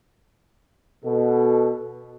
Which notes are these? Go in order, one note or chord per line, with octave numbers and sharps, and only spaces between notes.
B2 A4